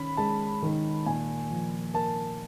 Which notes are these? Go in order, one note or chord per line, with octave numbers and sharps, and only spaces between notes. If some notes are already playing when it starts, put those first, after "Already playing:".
Already playing: D#3 C#4 B5
G#3 A5
D#3
A#2 G#5
F3
A#3 A5